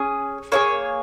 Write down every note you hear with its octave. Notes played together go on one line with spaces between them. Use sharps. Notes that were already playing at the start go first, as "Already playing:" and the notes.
Already playing: C#4 G#4
A#3 E4 G#4 C#5